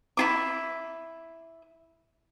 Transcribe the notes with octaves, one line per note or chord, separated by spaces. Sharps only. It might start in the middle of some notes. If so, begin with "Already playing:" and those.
E4 F4 D6